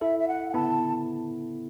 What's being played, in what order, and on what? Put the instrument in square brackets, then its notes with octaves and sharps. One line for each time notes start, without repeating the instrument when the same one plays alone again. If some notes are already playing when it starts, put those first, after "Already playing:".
[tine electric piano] E4 A4 [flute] E5
[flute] E5
F#5
F#5
[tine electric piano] B3 E4 [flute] A5